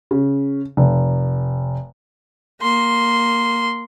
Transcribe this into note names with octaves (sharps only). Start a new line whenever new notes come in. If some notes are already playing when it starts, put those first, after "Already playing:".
C#3
F1
A#3 C6